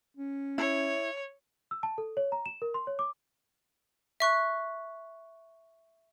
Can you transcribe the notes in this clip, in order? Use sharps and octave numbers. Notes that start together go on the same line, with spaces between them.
C#4
E4 C#5
E6
A5
A4
C#5
A#5
E7
A#4
C6
C#5
D6
E5 C#6 F#6